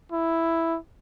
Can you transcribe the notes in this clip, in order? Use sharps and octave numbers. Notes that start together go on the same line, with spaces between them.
E4